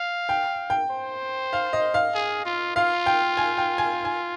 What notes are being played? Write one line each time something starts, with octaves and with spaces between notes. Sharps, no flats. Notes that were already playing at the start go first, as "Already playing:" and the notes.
Already playing: F5
G5
G5
C5
F5
D#5
F5
G#4
F4
F4 F5
G5
G#5
G5
G#5
G#5